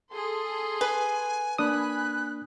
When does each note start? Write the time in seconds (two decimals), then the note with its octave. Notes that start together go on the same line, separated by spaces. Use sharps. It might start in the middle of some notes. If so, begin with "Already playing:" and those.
0.12 G#4 A4 C6
0.81 B4 G#5
1.58 A#3 D4 G#5 B5 D#6 F#6